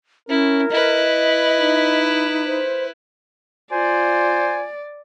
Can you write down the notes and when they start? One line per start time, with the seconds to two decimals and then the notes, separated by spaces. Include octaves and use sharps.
0.29 C#4 E4 A#4
0.71 E4 B4 D#5
1.57 D#4
2.46 C5
3.72 F4 C5 D5 G#5